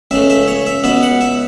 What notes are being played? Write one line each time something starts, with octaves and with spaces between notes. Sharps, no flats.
C#2 C#3 A3 E5
E5
C#5
E5
C#2 B2 B3 E5
F#5
E5